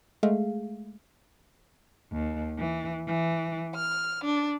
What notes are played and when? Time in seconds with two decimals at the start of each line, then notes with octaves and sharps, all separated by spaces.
0.23 G#3 A3 G#4 E5 F5
2.12 D#2
2.57 E3
3.07 E3
3.76 F6
4.24 D4